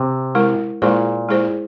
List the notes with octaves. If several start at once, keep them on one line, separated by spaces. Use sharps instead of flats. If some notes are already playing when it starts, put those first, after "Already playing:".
Already playing: C3
G#3 E4 A#4
A#2 G#3 E4 G#4 C5
G#3 E4 G#4 C5